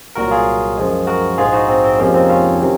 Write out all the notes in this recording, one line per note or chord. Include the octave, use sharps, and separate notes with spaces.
C2 A#2 F#3 F#4 A#4
F4 G#4
F#2 F3 G#3
F#4 A#4
A#1 G#2 F3 G#3 F4 G#4
D#4 F#4
C4
C4
F2 C3 F3 G#3 A#3 C#4
C4 D#4
C#4 F4
C3 D#3 F#3